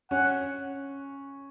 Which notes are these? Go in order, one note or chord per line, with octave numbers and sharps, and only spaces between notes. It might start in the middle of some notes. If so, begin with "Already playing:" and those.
C#4 F#5